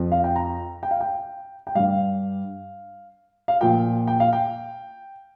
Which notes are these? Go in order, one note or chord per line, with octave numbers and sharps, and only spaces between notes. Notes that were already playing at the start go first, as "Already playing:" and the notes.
Already playing: F2 F3
F5
G5
A#5
G5
F5
G5
G5
G2 G3 F5
F5
A#2 F3 G5
G5
F5
G5